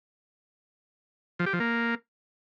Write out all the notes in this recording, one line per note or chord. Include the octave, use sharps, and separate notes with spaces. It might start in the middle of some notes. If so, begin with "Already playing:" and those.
F3
G4
F3
A#3